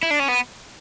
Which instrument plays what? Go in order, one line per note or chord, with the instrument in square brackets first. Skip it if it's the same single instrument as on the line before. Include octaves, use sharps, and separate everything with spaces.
[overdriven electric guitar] E4
D4
C#4
B3